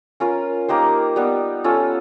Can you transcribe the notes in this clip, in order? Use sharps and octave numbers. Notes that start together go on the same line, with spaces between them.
C#4 F4 A#4
A#3 D#4 G4 C5
G3 B3 D#4
C#4 F4 A4